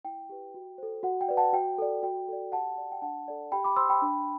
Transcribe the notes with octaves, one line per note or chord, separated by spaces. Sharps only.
E4 G5
G4 B4
F#4
A4 C5
F#4 F#5
G5
B4 D5
F#5 A5
F#4 G5
A4 D5
F#4 G5
A4 D5
G4 F#5 A5
D5
G5
D4 F#5 A5
A4 D5
G4 G5 B5
B5 D6
C5 C6 E6
G5 B5
D4